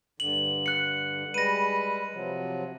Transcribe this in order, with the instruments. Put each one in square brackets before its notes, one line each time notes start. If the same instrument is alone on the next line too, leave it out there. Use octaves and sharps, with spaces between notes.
[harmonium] G2 D3 [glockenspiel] F#7
[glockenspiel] F#6 C#7
[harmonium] G3 G#3 B4 [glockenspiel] A#6 D#7
[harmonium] C3 F3 F#3